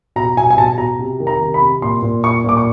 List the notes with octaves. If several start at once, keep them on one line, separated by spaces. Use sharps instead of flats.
B2 A#5
B2 G#5
G#5
B2 A5
B2 A#5
C3
D#3
A#5
C3
B5
C3
A#2 C6
A#2
A#2 C#6
A#2 D6
C#6